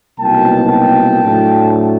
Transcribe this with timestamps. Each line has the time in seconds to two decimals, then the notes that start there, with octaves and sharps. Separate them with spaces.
0.18 C2 B2 F#3 A#3 D#4 G5 A5
0.70 G5 A5
1.22 A2 F#3 A3 D4